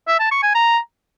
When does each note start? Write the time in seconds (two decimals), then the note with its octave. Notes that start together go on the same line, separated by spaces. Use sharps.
0.08 E5
0.20 A5
0.31 C#6
0.43 G#5
0.55 A#5